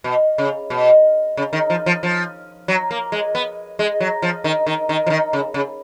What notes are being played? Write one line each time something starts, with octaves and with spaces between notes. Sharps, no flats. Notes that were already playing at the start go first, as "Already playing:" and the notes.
B2
C#3
B2
C#3
D#3
F3
F3
F3
F#3
A#3
G#3
B3
G#3
F#3
F3
D#3
D#3
D#3
F3
D#3
C#3
C#3